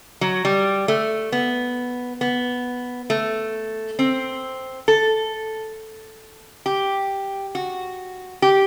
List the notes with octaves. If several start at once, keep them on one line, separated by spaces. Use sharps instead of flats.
F#3
G3
A3
B3
B3
A3
C4
A4
G4
F#4
G4